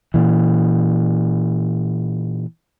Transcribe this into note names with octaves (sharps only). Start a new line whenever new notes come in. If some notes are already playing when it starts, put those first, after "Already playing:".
A#2 E3